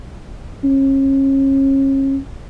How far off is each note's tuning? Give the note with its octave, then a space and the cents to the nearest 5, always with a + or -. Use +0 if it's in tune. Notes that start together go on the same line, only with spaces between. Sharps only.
C#4 -35